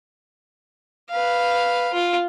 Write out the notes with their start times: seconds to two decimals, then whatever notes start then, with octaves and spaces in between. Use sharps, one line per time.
1.10 B4 F5
1.93 F4